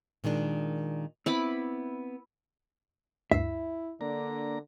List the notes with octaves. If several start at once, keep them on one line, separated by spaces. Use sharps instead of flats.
A#2 D#3 G#3 D4
B3 C4 E4 B5 D6
D2 G2 E4 E5 C7
D3 A#3 D4 A#5